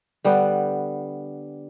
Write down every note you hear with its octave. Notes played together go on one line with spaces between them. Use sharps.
D3 G3 B3 G5